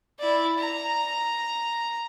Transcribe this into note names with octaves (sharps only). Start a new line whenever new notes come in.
E4 D5
A#5